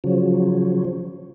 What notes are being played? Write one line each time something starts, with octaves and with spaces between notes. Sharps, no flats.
C#3 F3 F#3